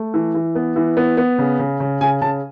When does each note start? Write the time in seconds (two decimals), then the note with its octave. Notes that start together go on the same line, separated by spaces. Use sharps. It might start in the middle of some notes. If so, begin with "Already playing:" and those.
Already playing: A3
0.14 E3
0.34 E3
0.55 B3
0.76 E3
0.97 B3
1.17 B3
1.38 C#3
1.59 C#3
1.80 C#3
2.01 C#3 G#5
2.22 C#3 A5